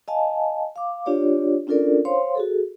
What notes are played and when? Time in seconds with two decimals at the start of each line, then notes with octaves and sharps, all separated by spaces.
0.08 D#5 F5 G#5 A5
0.76 F5 D6
1.06 D4 F4 G4 C#5 D5
1.67 C#4 D4 F4 A4 A#4 D5
2.05 C5 C#5 F5 C6
2.35 F#4 G#4 A4